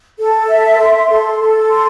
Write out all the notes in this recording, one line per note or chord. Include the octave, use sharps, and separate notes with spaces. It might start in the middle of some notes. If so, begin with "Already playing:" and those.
A4
E5
C6
A4
A4
C6